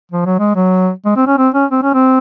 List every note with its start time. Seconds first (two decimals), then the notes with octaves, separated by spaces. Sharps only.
0.12 F3
0.26 F#3
0.39 G#3
0.56 F#3
1.05 G#3
1.16 C4
1.27 C#4
1.38 C4
1.54 C#4
1.71 C4
1.83 C#4
1.94 C4